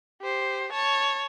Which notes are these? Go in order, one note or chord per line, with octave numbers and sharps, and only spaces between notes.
G4 C5
C#5 A5